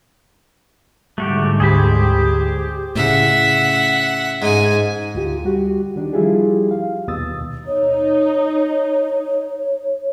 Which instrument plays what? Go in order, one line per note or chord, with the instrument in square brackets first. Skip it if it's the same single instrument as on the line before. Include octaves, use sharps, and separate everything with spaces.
[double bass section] G#2 D3 [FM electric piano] G3 [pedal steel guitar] A3 F#4 G4
[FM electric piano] D2 [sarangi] G4 [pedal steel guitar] G#4 C5 B5
[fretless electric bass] A2 C#3 [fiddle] E5 F#5
[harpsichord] G#2 [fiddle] G#5
[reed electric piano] D2 F4 G4
G3 F#4 G4
D#3 D4 D#4
F3 G3 E4 F4 G4 G#4
F5
D#2 B2 D#6 E6 A6
[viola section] D#4 [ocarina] C#5